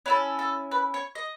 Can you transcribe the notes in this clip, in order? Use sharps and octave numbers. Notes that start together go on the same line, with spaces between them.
C#4 E4 A4 B4
A4
B4
C#5
D#5